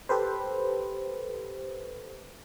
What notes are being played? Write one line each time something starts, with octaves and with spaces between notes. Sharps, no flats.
G4 A4 B4 C5